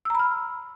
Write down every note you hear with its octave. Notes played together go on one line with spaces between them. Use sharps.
A#5 B5 E6 F6